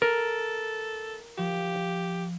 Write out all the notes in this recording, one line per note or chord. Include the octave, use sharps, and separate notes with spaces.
A4 A#4
F3 G4